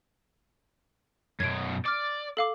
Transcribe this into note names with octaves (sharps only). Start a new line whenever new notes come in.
F#2 B2 G#6 D7
D5 D6 F6
A4 F5 D6